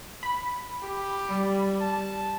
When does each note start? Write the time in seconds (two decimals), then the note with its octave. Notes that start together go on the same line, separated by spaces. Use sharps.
0.23 B5
0.82 G4
1.29 G3
1.81 A5